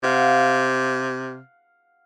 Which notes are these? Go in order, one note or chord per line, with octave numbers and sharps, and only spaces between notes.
C3 F5 F#5